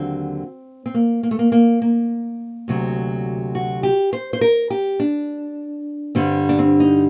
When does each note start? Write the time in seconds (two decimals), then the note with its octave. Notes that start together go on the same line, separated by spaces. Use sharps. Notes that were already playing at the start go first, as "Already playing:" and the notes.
Already playing: D#2 D3 F#3 C4
0.86 C4
0.94 A#3
1.23 A#3
1.31 A3
1.39 A#3
1.52 A#3
1.82 A#3
2.68 D2 C3 F#3
3.55 F#4
3.83 G4
4.13 C5
4.33 C5
4.41 A#4
4.70 G4
5.00 D4
6.15 G2 D3 G3 C4
6.49 D4
6.59 C4
6.80 D#4